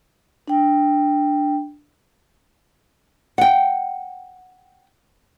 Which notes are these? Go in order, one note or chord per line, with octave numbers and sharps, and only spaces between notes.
D4 G5
F#5 G5